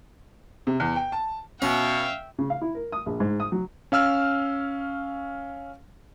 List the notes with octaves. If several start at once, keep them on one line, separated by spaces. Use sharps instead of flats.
C3
E2
G5
A5
B2 C#4 E5 F5 G5
C#3
F5
E4
A#4
D#6
A#1
G#2
D#6
F#3
C#4 F5 E6 F6